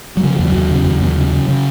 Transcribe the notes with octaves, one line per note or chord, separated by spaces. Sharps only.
F#3
C#3 F3
D#2 F3
F#3
D#2
C#3
D#2
D#2
C#3
C#3
C#3